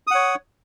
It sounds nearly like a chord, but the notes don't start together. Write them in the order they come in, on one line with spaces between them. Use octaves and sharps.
D#6 F#5 C#5